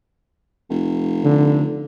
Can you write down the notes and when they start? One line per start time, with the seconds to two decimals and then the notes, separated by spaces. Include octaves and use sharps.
0.70 F1
1.24 D3